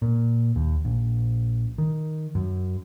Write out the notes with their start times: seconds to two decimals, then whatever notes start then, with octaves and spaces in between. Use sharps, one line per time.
0.02 A#2
0.56 D#2
0.85 A#1
1.78 D#3
2.35 F#2